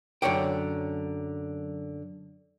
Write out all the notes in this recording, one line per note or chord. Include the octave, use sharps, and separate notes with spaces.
F#2 D3 G3 C#5 D5 G5